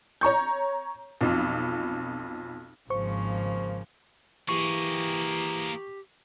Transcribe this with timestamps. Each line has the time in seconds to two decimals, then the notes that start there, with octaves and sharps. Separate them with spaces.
0.21 C#5 A#5 C#6 G6
1.21 B1 F2
2.90 G#1 C#3 F3 A#3 C5 C#6
4.49 E3 A#3 G4 G#4 C#6